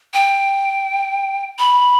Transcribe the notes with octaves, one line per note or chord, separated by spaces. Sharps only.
G5
B5